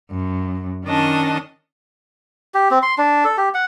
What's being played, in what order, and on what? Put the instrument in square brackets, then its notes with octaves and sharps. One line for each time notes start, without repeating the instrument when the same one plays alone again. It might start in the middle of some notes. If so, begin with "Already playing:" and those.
[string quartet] F#2
D#3 C#4 D4 D#5 A5
[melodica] G4
C4
C6
D4
A4
G4
F#5